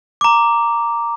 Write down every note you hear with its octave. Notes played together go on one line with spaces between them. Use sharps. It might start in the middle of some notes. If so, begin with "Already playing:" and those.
A#5 D6